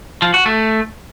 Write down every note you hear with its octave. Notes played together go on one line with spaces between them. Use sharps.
F3
F#4
A3